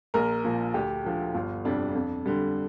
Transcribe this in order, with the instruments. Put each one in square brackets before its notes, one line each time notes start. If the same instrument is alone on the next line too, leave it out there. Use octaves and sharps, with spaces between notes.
[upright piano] A#1 A#4
A#2 F3
D2 G4
D3 F3
G1 F4
F2 C3 G3 D4
F2
D3 G3